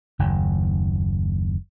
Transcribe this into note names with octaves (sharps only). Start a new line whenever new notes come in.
F#1 D#2